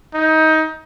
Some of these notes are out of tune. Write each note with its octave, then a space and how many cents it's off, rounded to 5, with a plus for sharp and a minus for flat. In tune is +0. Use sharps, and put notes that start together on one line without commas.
D#4 +20